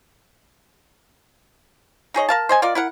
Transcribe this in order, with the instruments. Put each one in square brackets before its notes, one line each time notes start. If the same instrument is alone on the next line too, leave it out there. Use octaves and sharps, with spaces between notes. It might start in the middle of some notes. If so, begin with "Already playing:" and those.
[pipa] D#4 G#4 C#5 D#5
A#4 F5 A5
C5 D#5 G#5
F4 A#4 D5 D#5
E4 A#4 F#5